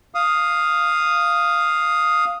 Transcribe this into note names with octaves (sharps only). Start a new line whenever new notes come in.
F5 D#6